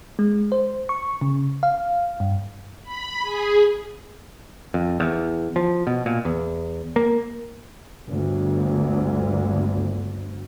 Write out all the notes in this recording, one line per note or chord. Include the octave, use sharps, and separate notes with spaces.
G#3
C5
C#6
C#3
F5
G2
B5
G#4
F2
E2
F3
B2
A#2
E2
A#3
G1 D2